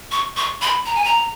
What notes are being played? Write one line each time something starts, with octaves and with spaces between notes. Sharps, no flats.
C#6
C#6
B5
A#5
G#5
A#5